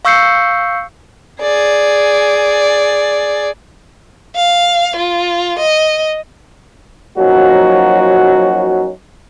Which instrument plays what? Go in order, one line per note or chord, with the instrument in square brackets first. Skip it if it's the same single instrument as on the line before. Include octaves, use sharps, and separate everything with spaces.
[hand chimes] F5 C#6 E6 G6 C7 C#7
[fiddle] G#4 D5
[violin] F5
F4
D#5
[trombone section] F3 F#3 A#3 C#4 D#4 F#4